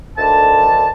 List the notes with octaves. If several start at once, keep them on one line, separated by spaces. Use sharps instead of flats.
D2 D3 D#3 A5